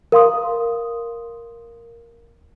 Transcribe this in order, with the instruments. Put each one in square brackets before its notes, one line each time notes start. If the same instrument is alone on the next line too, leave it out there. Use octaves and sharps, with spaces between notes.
[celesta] A#4 F5 C6 D#6